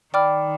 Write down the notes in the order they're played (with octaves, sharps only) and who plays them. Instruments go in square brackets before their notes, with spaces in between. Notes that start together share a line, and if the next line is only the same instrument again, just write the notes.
[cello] D#3 [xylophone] D5 G5 B5 D6 F6